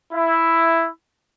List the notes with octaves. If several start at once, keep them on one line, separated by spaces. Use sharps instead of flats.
E4